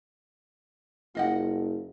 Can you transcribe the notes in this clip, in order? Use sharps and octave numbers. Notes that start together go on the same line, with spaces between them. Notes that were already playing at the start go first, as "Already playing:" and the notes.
F#1 F4 D#5 F#5